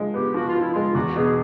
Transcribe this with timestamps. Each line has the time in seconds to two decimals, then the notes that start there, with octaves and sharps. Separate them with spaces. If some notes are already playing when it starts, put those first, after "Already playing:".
Already playing: F3 G#3
0.14 B3 G4
0.34 F3 F#4
0.48 F4
0.56 F3 E4
0.72 G#3 F4
0.95 E2 F#4
1.16 B2 G#4